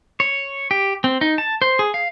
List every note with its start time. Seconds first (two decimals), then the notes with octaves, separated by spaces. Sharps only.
0.20 C#5
0.71 G4
1.04 C4
1.21 D#4
1.38 A5
1.62 C5
1.79 G#4
1.94 F5